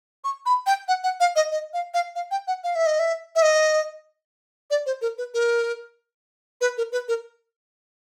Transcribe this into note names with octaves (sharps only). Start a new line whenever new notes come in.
C#6
B5
G5
F#5
F#5
F5
D#5
D#5
F5
F5
F5
G5
F#5
F5
E5
D#5
E5
E5
D#5
D5
C5
A#4
B4
A#4
B4
A#4
B4
A#4